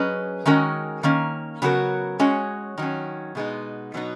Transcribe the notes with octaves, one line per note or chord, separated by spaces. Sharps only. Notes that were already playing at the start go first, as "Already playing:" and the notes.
Already playing: F#3 C#4 G#4 B4 D#5
D#3 G#3 C#4 F#4 A#4
D#3 A#3 C#4
C#3 F#3 B3 F#4 A#4
G#3 C#4 F#4 C#5
D#3 F#3 C#4
B2 G#3 B3 D#4
B2 F#3 B3 D#4